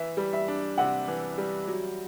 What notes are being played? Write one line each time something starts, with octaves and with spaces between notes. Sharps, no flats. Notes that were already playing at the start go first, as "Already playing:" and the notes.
Already playing: E3 E5
G3
E5
D4
C3 F#5
E3
G3
F#3